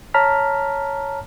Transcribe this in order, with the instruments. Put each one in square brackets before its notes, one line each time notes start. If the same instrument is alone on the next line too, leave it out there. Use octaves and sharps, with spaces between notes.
[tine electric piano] C#5 A5 A#5 F6 B6